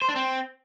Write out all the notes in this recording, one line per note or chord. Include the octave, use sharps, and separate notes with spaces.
C5
D4
C4